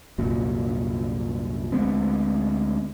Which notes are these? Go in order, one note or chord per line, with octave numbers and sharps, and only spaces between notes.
C2 F#2 A#2 F#3
D2 G#3 B3 C4